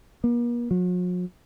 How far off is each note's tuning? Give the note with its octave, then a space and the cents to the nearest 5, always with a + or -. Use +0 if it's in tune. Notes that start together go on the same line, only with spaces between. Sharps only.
A#3 +45
F#3 -45